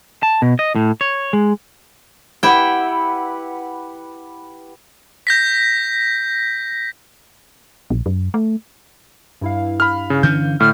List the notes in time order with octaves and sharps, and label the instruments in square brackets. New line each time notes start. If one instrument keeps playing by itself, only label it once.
[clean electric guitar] A5
B2
D#5
A2
C#5
G#3
[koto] E4 G5 [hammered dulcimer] G4 B4 F#5
[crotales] G6 A#6 B6
[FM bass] A#1
F#2
A3
[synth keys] G2 E4 F5
[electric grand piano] B5 F6
C#3
[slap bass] D3 E3 C#4 [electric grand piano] G6
[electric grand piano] A2 [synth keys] D3 [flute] F6